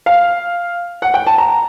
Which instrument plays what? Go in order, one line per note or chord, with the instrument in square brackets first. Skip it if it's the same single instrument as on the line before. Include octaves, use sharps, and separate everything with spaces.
[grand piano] F5
F#5
G5
A5
A#5